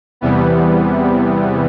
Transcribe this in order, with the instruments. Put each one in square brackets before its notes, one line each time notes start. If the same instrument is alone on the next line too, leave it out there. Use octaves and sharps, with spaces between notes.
[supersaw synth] E2 C3 E3 G3 B3